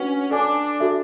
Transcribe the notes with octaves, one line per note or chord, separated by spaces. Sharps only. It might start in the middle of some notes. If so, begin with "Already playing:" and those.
Already playing: C#4 D4 F#4 B4 F#5 C#6
D4 A4 D5 G#5 D6
F#4 A4 E5